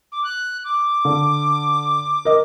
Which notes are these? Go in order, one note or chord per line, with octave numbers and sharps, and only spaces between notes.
D6
F#6
D6
D3
A#4 D#5